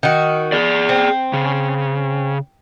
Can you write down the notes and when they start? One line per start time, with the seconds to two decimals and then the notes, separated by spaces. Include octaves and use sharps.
0.03 D#3 F#4
0.52 G#4 D5
0.89 C4
1.33 C#3